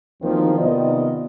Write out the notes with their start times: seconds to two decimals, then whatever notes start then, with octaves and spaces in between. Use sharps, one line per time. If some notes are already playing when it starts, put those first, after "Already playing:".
0.22 E2 D#3 F3 F#3 A#3 C4
0.57 C3 D#3 B3 F4 D5 D#5